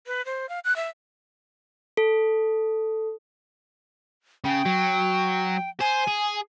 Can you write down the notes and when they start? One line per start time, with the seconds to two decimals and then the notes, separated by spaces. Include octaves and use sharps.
0.07 B4
0.25 C5
0.49 F5
0.64 F#6
0.76 E5
1.97 A4
4.45 C#3 G5
4.66 F#3
5.81 C5 G#5
6.08 G#4